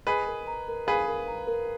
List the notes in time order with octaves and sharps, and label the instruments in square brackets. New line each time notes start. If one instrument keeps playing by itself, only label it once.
[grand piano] G#4 B4 [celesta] D#5
[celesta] A#4
A#5
A#4
[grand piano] G#4 B4 [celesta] F5
[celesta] A#4
A#5
A#4